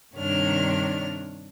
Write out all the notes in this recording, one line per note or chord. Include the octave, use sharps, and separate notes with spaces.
G2 C3 D#3 D4 C#5 F6